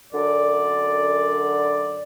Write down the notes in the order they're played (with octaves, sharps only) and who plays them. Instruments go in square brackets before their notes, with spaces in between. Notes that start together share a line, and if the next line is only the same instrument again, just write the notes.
[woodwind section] F#2 D3 D5